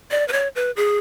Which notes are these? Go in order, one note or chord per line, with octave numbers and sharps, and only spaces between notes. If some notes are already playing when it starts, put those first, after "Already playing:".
D5
B4
C#5
B4
G#4